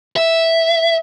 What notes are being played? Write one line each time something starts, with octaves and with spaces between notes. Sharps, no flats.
E5